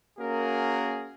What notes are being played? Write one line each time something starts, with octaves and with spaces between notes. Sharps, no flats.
A#3 C#4 F#4 G#4 A#4